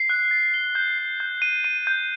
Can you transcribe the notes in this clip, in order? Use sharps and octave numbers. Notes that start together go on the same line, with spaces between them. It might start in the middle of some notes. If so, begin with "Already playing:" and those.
Already playing: C7
F#6
A6
G7
G6
C7
G6
D#7
D#7
G6